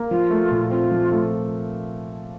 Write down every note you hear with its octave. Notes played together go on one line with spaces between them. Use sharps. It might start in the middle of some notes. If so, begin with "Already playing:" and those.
Already playing: A#3
F3 F4
A3
A#2
C4 F4
F3
A3